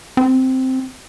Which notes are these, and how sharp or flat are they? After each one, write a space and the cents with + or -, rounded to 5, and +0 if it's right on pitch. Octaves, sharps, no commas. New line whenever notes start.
C4 -5